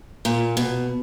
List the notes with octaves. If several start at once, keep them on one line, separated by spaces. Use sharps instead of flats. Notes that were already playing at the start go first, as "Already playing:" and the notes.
A#2
B2